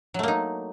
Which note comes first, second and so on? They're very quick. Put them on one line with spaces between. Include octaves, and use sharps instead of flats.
F#3 A3 A#3 D#4